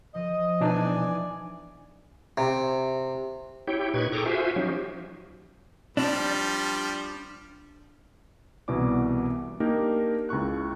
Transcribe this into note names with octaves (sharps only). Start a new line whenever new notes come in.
F3 D#5
B2 E3 D4 D#4 D5 G#5
C3
E4 G4 C#5 G5
A#2 D#4 B4 C#6 G#6
G#4 A4 G5 A#5 C#6 D6
F4 F#4 C5 E5 G#5
F3 F#3 C#4 D#4 G4
F3 G3 D4
C2 B2 E3 D5 D6
A#3 D4 D#4 G4 A#4
C#2 E4 C#6 F#6